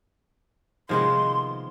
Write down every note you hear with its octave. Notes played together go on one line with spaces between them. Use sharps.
C3 D#3 F3 G#3 A#3 B3 C6